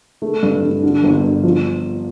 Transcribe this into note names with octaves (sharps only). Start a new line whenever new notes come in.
A3
G2
G2
D3
G1
G1
F3